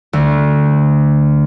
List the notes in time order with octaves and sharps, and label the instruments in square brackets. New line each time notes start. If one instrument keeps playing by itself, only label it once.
[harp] D2